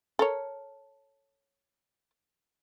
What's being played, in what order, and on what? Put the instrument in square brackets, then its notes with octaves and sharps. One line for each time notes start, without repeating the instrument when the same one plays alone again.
[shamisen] A4 A#4 C#5